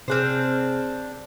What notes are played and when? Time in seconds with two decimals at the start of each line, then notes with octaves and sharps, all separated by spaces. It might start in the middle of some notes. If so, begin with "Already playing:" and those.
0.08 C3 C4 D4 G#4 C5 F6